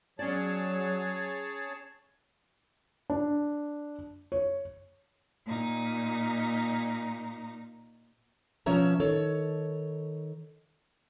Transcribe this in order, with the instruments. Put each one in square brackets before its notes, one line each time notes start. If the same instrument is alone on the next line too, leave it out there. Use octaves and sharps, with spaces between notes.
[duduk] F#3 [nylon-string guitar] C#4 D5 [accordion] G#4 C#5 A5
[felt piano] D4
C#5
[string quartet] A#2 D#4
[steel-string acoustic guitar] B2 F3 C#4 C#5 E5 A#5
D#3 A4 C#5